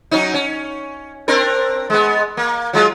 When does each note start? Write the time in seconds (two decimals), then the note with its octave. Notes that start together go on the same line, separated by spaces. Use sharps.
0.11 F#3 C#4 D#4
0.34 C#4
1.28 C4 D4 A#4
1.90 G#3 B3
2.37 A#3
2.73 F#3 G#3 F4